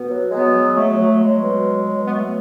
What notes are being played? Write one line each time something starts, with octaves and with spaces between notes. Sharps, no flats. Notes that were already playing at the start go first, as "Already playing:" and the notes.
Already playing: B2 B3
F#3
F#3 G#3 B3
F#3
F#3 A3
F#3
F#3 G#3
B2
F#3
F#3
B3
B2 A3